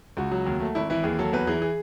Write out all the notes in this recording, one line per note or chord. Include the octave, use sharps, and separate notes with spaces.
C#2 F#4
F#3
D#2
A3
G#1 E4
E3 E4
D#2 G#4
F#3 A4
E2 B4
E3 G#4
G#4